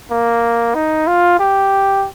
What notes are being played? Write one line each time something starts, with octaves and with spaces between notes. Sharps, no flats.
A#3
D#4
F4
G4